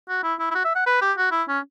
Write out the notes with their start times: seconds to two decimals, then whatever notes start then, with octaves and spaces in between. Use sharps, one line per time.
0.09 F#4
0.24 E4
0.40 E4
0.51 E4
0.55 F#4
0.65 E5
0.75 F#5
0.86 B4
1.02 G4
1.18 F#4
1.32 E4
1.49 C#4